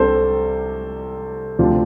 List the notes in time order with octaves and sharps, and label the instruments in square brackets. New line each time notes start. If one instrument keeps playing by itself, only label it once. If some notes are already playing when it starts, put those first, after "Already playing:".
Already playing: [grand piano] C2 C3 G3 D4 [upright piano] A4 C5
[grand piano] D2 C3 F3 D4 F4